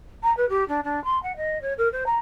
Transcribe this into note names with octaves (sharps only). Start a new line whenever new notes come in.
A#5
B4
G4
D4
D4
C6
F#5
D#5
C#5
A#4
C5
A#5